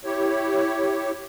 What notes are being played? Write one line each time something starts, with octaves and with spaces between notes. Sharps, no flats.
E4 G4 C#5